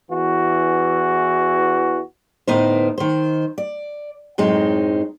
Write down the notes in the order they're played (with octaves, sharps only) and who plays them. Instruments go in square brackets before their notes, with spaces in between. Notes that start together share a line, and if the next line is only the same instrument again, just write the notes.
[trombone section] E2 E3 F#4
[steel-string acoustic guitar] D2 A2 B3 D#4 A#4 C5
D#3 C5
D5
F#2 A2 G#3 C4 D#4